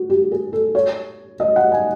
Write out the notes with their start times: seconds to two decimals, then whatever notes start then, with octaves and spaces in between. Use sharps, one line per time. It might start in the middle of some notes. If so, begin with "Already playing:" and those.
Already playing: F#4
0.10 G4
0.32 G#4
0.53 A4
0.75 C#5
1.40 D#5
1.56 F#5
1.72 G#5